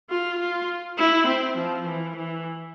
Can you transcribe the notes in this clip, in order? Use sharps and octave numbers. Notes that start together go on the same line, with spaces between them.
F4
F4
E4
C4
F3
E3
E3